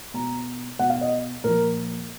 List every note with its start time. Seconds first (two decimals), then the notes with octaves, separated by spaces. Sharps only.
0.14 B2 A#5
0.79 B2 F#5
0.90 F5
1.01 D#5
1.44 A#2 F3 A#4